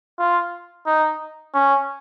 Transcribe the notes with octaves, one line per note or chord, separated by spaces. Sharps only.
F4
D#4
C#4